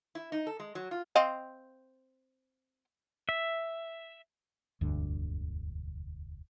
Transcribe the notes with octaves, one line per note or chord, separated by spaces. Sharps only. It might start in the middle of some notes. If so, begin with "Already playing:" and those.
E4
D#4
A4
G#3
F#3
F4
C4 D#5 F5
E5
E1 D2 G2 D3